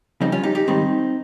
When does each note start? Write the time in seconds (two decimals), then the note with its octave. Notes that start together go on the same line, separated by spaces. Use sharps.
0.21 F2 C#3 G3 C4 D#4
0.32 C#4 F4
0.44 D#4 G4
0.55 D#4 G4
0.67 G#2 D#3 G3 C4 D#4